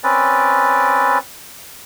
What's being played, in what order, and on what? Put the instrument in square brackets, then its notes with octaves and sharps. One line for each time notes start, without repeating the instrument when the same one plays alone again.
[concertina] C4 C#4 B4 D5